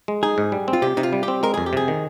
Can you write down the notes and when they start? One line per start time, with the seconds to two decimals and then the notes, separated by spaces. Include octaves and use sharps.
0.08 G#3
0.23 D#4 G#4
0.38 G#2
0.52 G3
0.68 C4
0.73 F4
0.82 C3 G4
0.97 C3 D#4
1.03 F4
1.13 G3
1.23 G4
1.28 C4
1.43 G#3 A#4
1.54 F2 G#4
1.66 G4
1.73 C3 G#4
1.88 D#3